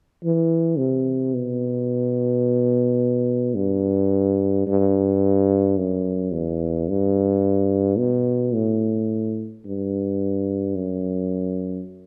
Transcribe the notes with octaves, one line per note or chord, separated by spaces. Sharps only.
E3
C3
B2
G2
G2
F#2
E2
G2
B2
A2
G2
F#2